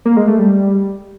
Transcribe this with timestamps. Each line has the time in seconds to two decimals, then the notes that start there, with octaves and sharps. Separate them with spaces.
0.05 A#3
0.17 G#3
0.28 A3
0.39 G3